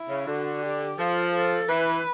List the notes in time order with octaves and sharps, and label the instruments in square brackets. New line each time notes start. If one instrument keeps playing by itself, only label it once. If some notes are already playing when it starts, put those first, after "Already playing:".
Already playing: [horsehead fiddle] E4
[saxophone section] C#3
[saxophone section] D3 [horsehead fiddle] F#4
[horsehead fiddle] G4
[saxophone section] F3 [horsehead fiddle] A4
[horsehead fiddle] A4
[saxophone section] E3 [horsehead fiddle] B4